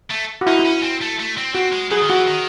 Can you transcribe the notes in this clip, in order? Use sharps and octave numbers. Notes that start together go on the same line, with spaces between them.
A3
F#4
D#4 E4
E4
C#4
C4
A3
A3
C4
C4 F#4
G#3
F#3 G#4
D#3
E3 F#4
D#3